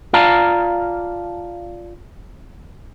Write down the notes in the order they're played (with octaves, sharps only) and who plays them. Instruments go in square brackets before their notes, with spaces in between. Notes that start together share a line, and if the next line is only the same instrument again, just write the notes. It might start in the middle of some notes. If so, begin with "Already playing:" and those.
[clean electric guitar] F4 D5 F5 A5 A#5